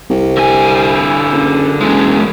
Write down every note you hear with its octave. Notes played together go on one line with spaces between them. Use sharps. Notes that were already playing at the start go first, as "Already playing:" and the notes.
C2
D3 G#5
F#1
F#1 E2 G#3